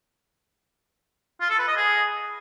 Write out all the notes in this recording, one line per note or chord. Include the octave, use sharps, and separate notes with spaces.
F4
A4
B4
D#5
G#4